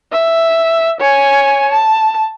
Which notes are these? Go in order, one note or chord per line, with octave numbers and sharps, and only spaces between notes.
E5
C#5 G#5
A5